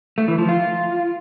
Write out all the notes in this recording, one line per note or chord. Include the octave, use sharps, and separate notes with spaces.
A3
E3
F3
F4